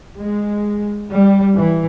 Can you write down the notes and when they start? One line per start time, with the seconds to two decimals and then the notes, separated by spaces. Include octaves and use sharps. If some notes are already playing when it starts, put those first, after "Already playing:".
0.17 G#3
1.10 G3
1.56 E3